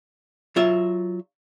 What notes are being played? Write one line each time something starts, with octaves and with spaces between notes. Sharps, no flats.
F#3 F4 E5